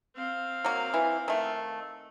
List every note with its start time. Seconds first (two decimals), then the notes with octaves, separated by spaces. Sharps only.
0.15 C4 F5
0.64 F#3 A#3
0.94 E3
1.28 D#3 A3